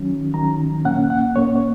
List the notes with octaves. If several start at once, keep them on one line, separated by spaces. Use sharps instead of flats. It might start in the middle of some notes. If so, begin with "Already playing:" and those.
Already playing: D#3 F#3 C#4
D#3 F#3 C#4 A#5
A#2 A#3 C#4 F#5
F#5
A#2 A#3 C#4 C#5
C#5